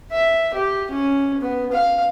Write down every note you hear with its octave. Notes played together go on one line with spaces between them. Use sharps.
E5
G4
C#4
B3
F5